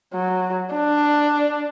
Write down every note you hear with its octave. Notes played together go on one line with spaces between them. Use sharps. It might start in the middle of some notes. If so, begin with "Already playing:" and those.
F#3
D4